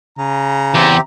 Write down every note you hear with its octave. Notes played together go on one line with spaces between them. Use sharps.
C#3 A#5
E2 C4 G4